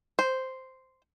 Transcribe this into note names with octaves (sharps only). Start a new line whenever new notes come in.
C5